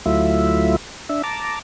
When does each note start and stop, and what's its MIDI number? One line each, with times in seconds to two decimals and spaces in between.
0.06 0.76 38
0.06 0.76 54
0.06 0.76 57
0.06 0.76 64
0.06 0.76 65
0.06 0.76 76
1.09 1.22 62
1.09 1.22 76
1.23 1.59 81
1.23 1.59 82
1.23 1.59 86